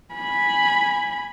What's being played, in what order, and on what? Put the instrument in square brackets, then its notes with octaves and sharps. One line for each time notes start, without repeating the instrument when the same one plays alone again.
[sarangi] G#5 [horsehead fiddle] B5